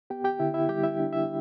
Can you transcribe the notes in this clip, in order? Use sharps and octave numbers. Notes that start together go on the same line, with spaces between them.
B3 G4 G5
G4 G5
D3 E4 E5
E4 E5
G3 G4 G5
E4 E5
D4
E4 E5